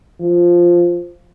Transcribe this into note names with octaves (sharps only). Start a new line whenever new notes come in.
F3